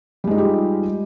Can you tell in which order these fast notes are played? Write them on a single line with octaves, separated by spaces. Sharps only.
G3 G#3 D#4 F4 G4